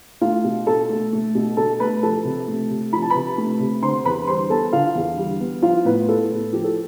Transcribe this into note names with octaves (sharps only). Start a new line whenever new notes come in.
A3 F4 F5
B2
B2 A4 A5
A3
A3
B2
B2 A4 A5
A3 B4 B5
F3 A4 A5
C3
A3
C3
F3 B5
A5
C3 B4 B5
A3
C3
D3 C5 C6
E2 B4 B5
G3 C5 C6
B3 A4 A5
D3 F4 F5
E2
G3
B3
F3 F4 F5
A2 B3 B4
B3 A4
A2
F3 G4
A4